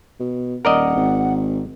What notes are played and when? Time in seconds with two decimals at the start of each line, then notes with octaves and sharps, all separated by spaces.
0.20 B2
0.65 D#1 A#4 D5 D#5 F#5
0.96 G#1